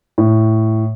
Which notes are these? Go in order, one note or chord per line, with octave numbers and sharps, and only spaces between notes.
A2